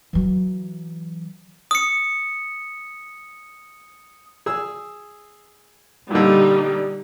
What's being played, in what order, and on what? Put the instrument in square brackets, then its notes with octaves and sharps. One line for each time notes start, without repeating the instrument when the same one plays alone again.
[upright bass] E3 F#3
[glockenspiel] D#6 C#7
[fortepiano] G#4 E6
[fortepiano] A#2 D3 [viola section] G3 D#4